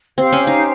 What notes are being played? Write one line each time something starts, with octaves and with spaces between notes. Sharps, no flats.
C4 G4 C5 F5
C#4
D#4